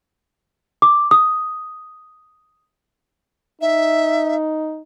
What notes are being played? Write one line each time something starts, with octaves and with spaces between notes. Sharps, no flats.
D6
D#6
D#4 E5